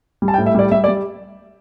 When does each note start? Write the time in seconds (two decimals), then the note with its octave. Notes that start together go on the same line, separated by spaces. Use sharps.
0.22 G3
0.28 A5
0.34 G5
0.38 A2
0.46 E5
0.55 G3 D5
0.71 G3 E5
0.84 D5
0.88 G3